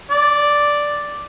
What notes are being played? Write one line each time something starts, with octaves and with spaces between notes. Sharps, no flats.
D5